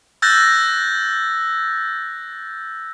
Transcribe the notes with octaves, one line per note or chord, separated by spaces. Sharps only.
E6 F#6 G6 A6 A#6